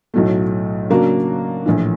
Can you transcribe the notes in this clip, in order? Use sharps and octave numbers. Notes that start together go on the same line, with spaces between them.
B1 A2 F#3 A3
C#3 F#3 A#3 D4 F#4
A#1 A2 E3